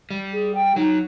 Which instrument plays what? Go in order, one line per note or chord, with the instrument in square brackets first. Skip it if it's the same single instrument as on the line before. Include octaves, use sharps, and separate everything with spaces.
[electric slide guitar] G3
[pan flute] G#4
G5
[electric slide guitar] F#3 [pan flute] D#4